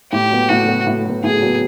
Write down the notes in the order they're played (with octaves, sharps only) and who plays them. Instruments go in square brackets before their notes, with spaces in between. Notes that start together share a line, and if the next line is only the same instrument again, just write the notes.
[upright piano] A2 [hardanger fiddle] G4
[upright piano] F#3 B3
[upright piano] A2 [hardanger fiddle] F#4
[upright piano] F#3 B3
A2
F#3 B3
[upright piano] A2 [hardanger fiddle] G#4
[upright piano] F#3 B3